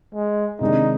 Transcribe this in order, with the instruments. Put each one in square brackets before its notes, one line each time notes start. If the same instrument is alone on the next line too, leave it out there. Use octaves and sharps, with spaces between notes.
[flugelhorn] G#3
[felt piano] C3 D#3 G#3 D4 [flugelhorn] D#4